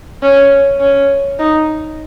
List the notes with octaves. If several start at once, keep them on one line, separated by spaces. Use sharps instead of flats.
C#4
C#4
D#4